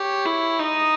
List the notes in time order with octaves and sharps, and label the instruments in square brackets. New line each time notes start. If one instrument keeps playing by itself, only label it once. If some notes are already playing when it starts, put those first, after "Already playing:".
Already playing: [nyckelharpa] G4 [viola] C#5
[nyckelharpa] E4
[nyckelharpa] D#4 [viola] D#5